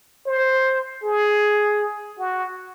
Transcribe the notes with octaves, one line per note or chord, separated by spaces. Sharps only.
C5
G#4
F#4